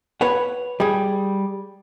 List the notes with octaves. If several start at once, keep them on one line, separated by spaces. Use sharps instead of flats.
B4 C#5 F#5
G3 G#4